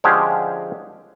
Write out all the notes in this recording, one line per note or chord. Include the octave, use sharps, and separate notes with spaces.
D3 F3 G#3 C#4 G4 G#4